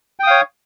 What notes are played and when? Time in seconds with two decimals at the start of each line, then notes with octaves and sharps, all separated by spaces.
0.20 G5
0.23 D#6
0.27 F5
0.31 C#5